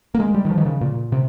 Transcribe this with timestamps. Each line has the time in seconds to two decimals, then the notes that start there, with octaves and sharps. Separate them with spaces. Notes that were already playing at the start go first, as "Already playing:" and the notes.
0.14 A#3
0.20 G#3
0.34 G3
0.45 D#3
0.51 F3
0.58 D#3
0.65 C#3
0.81 A#2
1.12 C3